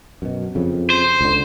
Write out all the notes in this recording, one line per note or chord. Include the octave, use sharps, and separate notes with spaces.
F#2 B2
F2 C#3
C5
C#2 D3